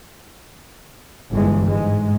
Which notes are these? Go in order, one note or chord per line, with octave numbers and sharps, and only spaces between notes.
G1 G2 E3 G#3
G#2 G#3